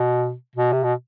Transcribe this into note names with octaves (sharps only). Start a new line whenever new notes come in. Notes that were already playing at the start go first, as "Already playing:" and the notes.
Already playing: B2
B2
C3
B2